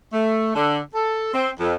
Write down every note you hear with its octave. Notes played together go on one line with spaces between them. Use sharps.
A3
D3
A4
C4
F2